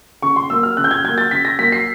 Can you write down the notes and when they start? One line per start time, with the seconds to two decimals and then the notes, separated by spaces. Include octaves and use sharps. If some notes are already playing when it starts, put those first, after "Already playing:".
0.22 C#3 C#6
0.36 C6
0.50 F#3 A#3 E6
0.63 F6
0.77 C#3 F#6
0.84 G6
0.91 G#6
1.04 F#3 A#3 G#6
1.18 A6
1.31 C#3 B6
1.45 A#6
1.59 F#3 A#3 B6
1.72 C7